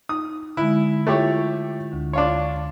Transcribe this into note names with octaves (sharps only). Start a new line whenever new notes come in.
D#4 D#6
D3 G#3 E4
A3 E4 F4 G4 C#5
D2 D3
D4 F4 C#5